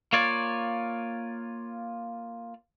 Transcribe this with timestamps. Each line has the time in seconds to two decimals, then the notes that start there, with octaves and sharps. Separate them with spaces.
0.13 A#3 F4 C#5 D5